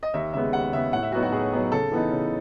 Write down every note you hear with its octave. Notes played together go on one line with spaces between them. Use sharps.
D#5
D#2 E5
C#3 G#3 B3 E5
D#2 F#5
C#3 G#3 B3 E5
A2 F#5
E5
F#3 B3 D#4 F#4
F#4
A2 G#4
F#3 B3 D#4
C#3 A4
E3 B3 D#4
C#3